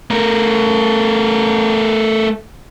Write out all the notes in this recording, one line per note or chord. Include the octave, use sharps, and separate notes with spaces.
A3 A#4